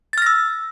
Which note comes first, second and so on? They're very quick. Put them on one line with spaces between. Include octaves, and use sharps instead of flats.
A6 F6 A#6 E6